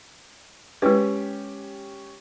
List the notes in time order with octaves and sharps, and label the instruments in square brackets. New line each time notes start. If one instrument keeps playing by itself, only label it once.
[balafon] G#3 E4 B4 [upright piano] C#4 G4